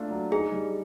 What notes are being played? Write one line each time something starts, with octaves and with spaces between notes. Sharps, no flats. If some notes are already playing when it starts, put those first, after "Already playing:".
Already playing: A3 A#3 D4 F4
F#3
D#4 G#4
G3